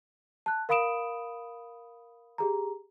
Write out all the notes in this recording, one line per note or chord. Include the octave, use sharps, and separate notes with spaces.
A5 F#6
A#4 F5 B5 D#6 D7 E7
G4 G#4 A#5